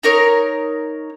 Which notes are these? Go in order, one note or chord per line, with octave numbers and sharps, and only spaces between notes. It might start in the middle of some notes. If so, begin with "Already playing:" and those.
D#4 A#4 C#5